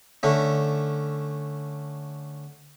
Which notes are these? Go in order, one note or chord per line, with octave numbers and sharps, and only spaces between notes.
D3 A3 C#4